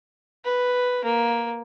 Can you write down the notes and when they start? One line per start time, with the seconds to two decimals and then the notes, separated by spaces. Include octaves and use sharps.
0.45 B4
1.04 A#3